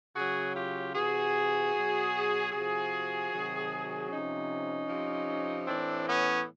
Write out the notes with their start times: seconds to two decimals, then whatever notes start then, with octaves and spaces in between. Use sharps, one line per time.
0.16 C#3 F#3 F#4 G#4
0.55 F4 G4
0.95 C3 E3 F#4 G#4
1.74 B2 F#3
2.52 C3 F3 F#4 G#4
3.31 C3 D#3 F#3
4.10 C3 F3 C#4 D#4
4.89 C3 F3
5.67 A2 E3 C4 D4
6.07 B3 C#4